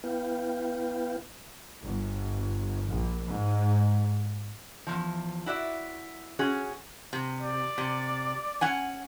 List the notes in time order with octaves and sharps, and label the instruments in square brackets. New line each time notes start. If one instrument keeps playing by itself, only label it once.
[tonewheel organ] B3 E4 B4 F5 G5
[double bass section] G1
A#1
G#2
[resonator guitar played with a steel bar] E2 A#2 F3
E4 F#4 D5 E5
C#4 F#4 G#4
C3
[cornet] D5
[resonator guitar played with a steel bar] C3
C#4 F#5 G#5